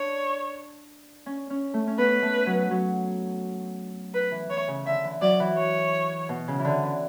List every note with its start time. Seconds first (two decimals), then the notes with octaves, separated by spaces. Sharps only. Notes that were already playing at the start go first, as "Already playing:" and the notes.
Already playing: D4 C#5
1.26 C#4
1.50 C#4
1.74 A3
1.88 C#4
1.98 B3 B4
2.22 A3
2.46 F#3
2.71 F#3
4.14 B4
4.31 E3
4.49 E3 C#5
4.68 C#3
4.86 D3 E5
5.04 E3
5.21 F#3 D5
5.40 E3
5.57 C#5
6.29 B2
6.48 C#3
6.59 E3
6.65 D3
6.83 E3